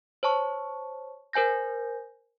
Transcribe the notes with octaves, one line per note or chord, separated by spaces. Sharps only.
C5 C#5 A5 C#6
A#4 C5 G#5 G6 A#6